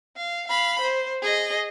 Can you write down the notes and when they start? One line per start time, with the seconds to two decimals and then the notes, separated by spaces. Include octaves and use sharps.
0.17 F5
0.48 F5 B5
0.81 C5
1.22 G#4 D#5